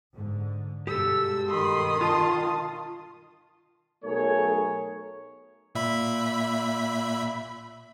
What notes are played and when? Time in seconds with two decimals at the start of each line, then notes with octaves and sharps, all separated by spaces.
0.14 G#2 D3
0.87 G2 B2 G#3 G4 A4 E6
1.49 D#3 B5 C6 D#6
2.01 F4 A5
4.04 B1 A3 G#4 A#4 C#5
5.75 A#2 E5 B5